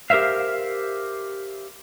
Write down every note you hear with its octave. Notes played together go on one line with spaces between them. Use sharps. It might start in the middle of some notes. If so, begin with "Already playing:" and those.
G4 A#4 C5 E5 F5